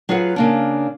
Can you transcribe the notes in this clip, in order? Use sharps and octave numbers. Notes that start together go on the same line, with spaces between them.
F#3 F4 G#4 B4 F#5
C#3 A#3 D4